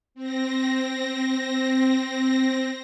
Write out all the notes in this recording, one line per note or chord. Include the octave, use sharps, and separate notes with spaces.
C4 A#6